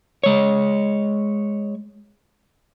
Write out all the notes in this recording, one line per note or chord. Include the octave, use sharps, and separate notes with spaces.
G#3 C#5